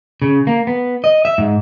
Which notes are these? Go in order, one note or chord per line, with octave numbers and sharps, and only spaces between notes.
C#3
A#3
B3
D#5
E5
G#2